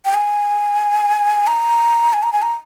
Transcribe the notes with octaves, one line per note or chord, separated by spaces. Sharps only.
G5
G#5
A#5
G#5
A#5
G#5
A#5